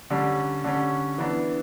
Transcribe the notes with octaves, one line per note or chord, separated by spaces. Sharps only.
D3 G3 C#4
D3 G3 C#4
E3 B3 D4